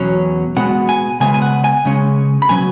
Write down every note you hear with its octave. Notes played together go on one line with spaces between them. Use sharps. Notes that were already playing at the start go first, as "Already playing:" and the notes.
Already playing: E2 B2 F#3 C#4
B2 G#3 B3 F#5
G#5
C#3 G#3 B3 G#5
G#5
F#5
G#5
C#3 G#3 C#4
B5
B2 F#3 C#4 G#5